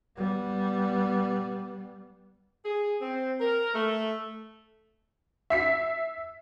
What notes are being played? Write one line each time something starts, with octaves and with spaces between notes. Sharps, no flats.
G3 B3
G#4
C4
A#4
A3
E5 B6 C7